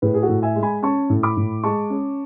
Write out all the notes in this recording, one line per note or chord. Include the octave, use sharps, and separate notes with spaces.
A2 G#4 B4
G#4
F#4 A4
A2
E5 G#5
G#3
G#5 B5
C#4 A5 C#6
A2
B5 D6
A2
G#3 A5 C#6
C#4